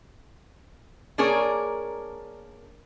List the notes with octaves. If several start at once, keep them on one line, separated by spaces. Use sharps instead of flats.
A#3 D4 G#4 A#4 C#5 D5